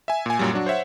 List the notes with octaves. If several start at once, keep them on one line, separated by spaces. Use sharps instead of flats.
E5 G#5
A#2 G#5
F#2 A#2 F#3 G3
F#3 D4 F#4
C5 C#5 E5 F#5